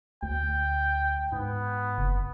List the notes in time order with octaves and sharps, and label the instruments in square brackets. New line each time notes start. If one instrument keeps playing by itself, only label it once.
[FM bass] D2 [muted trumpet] G5
[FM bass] G#2 [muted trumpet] B3
[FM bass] F#1